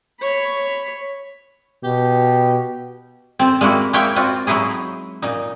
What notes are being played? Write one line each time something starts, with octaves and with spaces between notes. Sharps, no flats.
C#5 B5
B2 G4
C4 A4
G#3 A#3 E4 F#4
G#3 A#3 E4 C#5 G5
C4 F4 F#4
F#3 G#3 D#4 E4 G#4
A#2 D#4